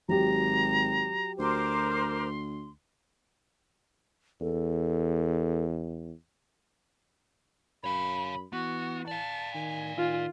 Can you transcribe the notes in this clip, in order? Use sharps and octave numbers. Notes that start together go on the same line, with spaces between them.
G#1 F#3 G4 A#5
D2 A#4 C5 C6 D6
E2 A4
F#2 C#5 F5 B5
E3 B3 F#4
D5 F5 A5
D#3 G#5
D#3 F4